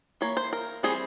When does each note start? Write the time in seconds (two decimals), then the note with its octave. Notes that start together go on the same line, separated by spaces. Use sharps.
0.21 E3 A#3 C#5
0.37 C5
0.53 A#4
0.83 E3 G3 C4 G#4